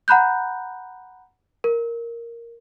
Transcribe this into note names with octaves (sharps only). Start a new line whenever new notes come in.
F#5 A#5 B5 F#6 G6
A#4